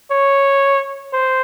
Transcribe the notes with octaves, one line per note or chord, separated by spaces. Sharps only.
C#5
C5